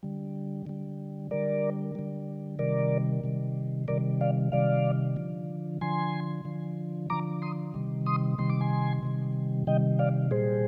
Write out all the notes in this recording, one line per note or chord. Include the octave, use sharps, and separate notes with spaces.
D3 G3
D3 G3
D3 G3 A#4 D5
D3 G3
C3 D#3 G3 A#4 D5
C3 D#3 G3
C3 D#3 G3 A#4 D5
D5 F5
C3 D#3 G3 D5 F5
D3 F3
D3 F3 G#5 C6
D3 F3
D3 F3 A#5 D6
C6 D#6
C3 D#3 G3
C6 D#6
C3 D#3 G3 C6
D6
G#5 C6
C3 D#3 G3
C3 D#3 G3 D#5 G5
D5 F5
A#2 G3 G#4 C5